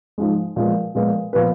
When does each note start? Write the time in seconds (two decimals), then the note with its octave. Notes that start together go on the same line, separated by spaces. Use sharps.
0.18 G#2 F3 G#3
0.56 A#2 F3 G#3 B3
0.95 A#2 F3 G#3 B3
1.33 A#2 F3 B3 F4 B4